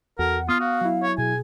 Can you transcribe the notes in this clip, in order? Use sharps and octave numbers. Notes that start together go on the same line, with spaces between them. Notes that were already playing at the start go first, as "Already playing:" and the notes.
E2 F#4 A4 A#4 F#5
B3 F4 D#6 F6
F#4 F5
F#3 E4
C#5
B2 G#4 G#5